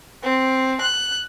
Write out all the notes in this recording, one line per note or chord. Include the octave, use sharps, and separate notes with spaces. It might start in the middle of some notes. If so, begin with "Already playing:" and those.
C4
F#6